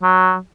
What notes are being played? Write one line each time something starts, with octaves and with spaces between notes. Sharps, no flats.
F#3